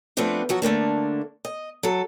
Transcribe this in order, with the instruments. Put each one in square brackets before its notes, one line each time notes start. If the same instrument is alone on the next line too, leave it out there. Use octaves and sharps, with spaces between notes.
[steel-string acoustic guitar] F3 A3 B3 C4 D4 B4
F3 F#3 F#4
D3 A3 A#3 D4
D#5
F#3 A4